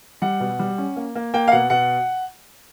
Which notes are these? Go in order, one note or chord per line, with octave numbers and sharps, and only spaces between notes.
G3 F#5
B2
G3
C#4
A#3
A#3
A#3 G5
F5
B2 F#5
B2 F#5